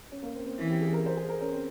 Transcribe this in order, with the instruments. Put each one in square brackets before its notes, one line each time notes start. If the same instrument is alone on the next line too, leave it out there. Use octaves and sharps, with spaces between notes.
[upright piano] C#4
A#3
C4
C4
[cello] E3 [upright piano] E4
[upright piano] G4
G#4
A#4
C5
G#4
A#4
C#4
C4